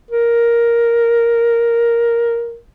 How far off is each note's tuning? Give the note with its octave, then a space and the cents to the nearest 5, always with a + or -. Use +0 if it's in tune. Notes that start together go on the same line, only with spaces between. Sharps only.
A#4 +5